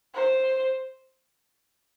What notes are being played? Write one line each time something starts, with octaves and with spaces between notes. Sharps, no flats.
C5